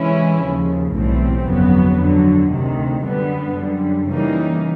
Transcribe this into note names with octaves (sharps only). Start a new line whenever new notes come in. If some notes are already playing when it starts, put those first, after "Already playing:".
Already playing: C3 E3 G#3 C#4 E4
D#2 C#3 F3
B1 A2 E3 G3 C4
G1 F2 C#3 F#3 B3
F2 D3 F#3
D2 C3 D#3
F#2 D3 G3 B3
F#2 D3 G3
C#3 E3 G3 A#3 D#4